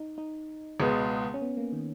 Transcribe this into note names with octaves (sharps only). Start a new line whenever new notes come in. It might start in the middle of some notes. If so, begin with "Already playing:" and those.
Already playing: D#4
D#4
C#2 B2 G#3 B3
C#4
B3
A#3
D#3